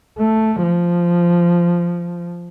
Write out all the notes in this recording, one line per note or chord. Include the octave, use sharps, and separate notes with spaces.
A3
F3